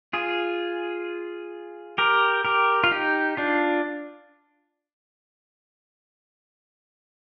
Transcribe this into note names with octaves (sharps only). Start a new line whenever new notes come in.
F4 G#4
G4 A#4
G4 A#4
F4
D#4 G4
D4 F4